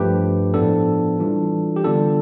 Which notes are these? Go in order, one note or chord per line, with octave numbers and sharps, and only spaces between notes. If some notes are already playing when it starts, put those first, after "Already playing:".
Already playing: G2 F3 A3 D4 G4 B4
A2 F3 B3 D4 A4
E3 G3 D4 F4
G4
D3 G3 B3 D4 F4 A4